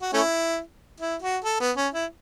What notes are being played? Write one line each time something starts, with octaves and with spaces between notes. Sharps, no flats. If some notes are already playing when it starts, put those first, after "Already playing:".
F#4
A3 C#4 E4
E4
F#4
A4
B3
C#4
E4